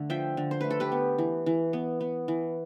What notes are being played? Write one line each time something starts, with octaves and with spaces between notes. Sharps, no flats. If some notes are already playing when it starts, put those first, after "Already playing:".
Already playing: D3 A3
F3 E5 G5
D3
C5
A3 B4
A4
G4 B4
B3
E3
E3
B3
B3
E3